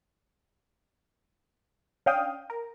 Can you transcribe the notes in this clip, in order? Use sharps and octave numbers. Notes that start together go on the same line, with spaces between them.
C#4 D4 F5 G5 D#6
A#4